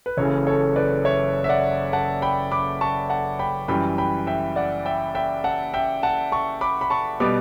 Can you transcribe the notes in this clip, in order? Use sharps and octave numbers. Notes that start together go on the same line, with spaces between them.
B4
F#1 F#2 C#3 E3 A4 C#5
A4 C#5
B4 D5
C#5 E5
E5
D5 F#5
F#5 A5
G5 B5
B5 D6
A5 C#6
F#5 A5
G5 B5
F#2 E3 G3 G5 B5
G5 B5
E5 G5
D5 F#5
E5 G5
E5 G5
F#5 A5
E5 G5
F#5 A5
A5 C#6
B5 D6
B5
A5 C#6
B2 G3 B3 B5 D6